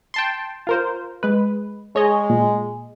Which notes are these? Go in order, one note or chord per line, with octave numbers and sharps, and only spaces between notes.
G5 A5 C6
F4 A#4 C5
G#3 B4
G#3 C#5 D#5
A#2